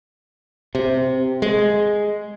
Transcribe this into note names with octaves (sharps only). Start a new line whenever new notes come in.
C3
G#3